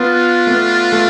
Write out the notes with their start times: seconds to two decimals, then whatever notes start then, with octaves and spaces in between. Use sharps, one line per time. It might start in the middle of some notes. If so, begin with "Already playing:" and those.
Already playing: B3 D4 F4 B4
0.47 A3
0.51 B3
0.93 A3